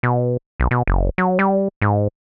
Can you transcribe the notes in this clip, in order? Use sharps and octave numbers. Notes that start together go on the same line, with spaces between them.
B2
B1
B2
F#1
F#3
G3
G#2